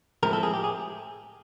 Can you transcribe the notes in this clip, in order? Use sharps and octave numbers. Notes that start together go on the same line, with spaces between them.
A2 F3 G#3 C4 E4 A#4
A4
G#4
G4
G#4